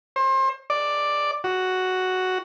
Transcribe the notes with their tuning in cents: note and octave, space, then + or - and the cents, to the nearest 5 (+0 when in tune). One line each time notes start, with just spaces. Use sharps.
C5 +30
D5 +5
F#4 +0